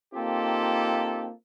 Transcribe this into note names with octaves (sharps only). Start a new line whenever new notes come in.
A#3 C4 D#4 F4 G4 A4